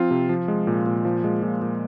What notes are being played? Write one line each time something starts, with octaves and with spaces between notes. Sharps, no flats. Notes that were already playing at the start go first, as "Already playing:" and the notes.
Already playing: F3 C4 F4
C3
F3
G#3
A#2
A#2
F3
G#3
A#2
A#2